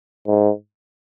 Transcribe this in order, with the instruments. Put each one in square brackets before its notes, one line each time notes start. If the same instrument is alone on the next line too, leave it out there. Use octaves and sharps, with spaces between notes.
[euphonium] G#2